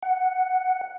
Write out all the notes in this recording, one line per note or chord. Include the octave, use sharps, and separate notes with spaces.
F#5